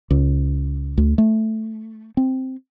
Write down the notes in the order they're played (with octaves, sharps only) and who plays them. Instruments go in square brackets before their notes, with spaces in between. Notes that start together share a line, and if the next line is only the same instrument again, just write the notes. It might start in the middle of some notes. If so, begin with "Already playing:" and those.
[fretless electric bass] C#2
D2
A3
C4